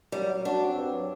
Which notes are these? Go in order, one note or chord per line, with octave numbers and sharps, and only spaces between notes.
F#3 G3
F#4
D4 F#4
C4
G2
F#3